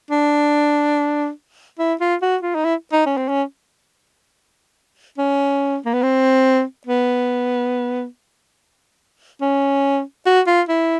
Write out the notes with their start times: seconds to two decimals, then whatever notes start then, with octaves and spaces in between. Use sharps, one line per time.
0.11 D4
1.79 E4
2.01 F4
2.22 F#4
2.43 F4
2.55 D#4
2.64 E4
2.93 D#4
3.06 C#4
3.17 C4
3.28 C#4
5.18 C#4
5.86 A#3
5.94 B3
6.03 C4
6.87 B3
9.41 C#4
10.26 F#4
10.47 F4
10.69 E4